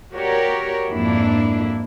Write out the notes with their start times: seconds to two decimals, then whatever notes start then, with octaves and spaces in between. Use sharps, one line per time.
0.13 F#4 G4 A#4 C#5 D5
0.89 F2 G#2 A#3 D4 E4